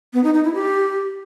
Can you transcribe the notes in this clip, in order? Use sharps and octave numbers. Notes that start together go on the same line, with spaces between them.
B3
D#4
D#4
E4
G4